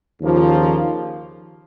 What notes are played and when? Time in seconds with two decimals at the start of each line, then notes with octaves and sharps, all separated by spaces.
0.20 D#2 C#3 F3 A#3